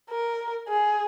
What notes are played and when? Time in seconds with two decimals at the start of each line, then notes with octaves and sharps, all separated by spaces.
0.10 A#4
0.69 G#4